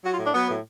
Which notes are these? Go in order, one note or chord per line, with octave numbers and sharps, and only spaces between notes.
F#3 F#4
F4
A2 D4
F#3 B3
A2